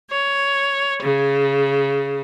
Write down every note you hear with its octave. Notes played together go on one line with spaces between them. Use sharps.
C#5
C#3